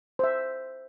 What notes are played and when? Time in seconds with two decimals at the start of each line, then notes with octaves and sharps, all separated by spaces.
0.19 C5 E5